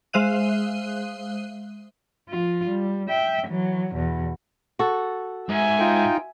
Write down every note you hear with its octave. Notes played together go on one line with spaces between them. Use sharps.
G#3 C5 E5 F5 F#6 D#7
F3 F4
G3
E5 G5
E3 F#3
E2 B2
F#4 A4
G#2 E5 G#5
D#4 F4 G5